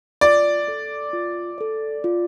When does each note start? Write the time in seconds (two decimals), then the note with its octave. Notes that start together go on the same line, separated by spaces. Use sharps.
0.21 F4 D5
0.67 A4 D5
1.13 F4
1.58 A4 D5
2.04 F4